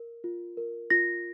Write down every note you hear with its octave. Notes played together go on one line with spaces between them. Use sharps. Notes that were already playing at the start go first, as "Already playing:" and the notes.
Already playing: A#4
F4
A#4
F4 A#6